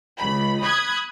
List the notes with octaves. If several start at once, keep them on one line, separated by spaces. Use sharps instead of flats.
C#2 B5
B5 D#6 F#6 G#6